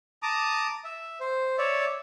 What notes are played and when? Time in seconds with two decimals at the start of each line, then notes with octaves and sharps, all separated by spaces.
0.23 A5 A#5 D6 D#6
0.84 E5
1.20 C5
1.58 C#5 D5 E5